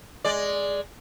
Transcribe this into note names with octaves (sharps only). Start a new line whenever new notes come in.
G#3 D5